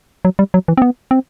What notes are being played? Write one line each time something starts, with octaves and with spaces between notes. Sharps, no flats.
F#3
G3
F#3
E3
C4
B3
C4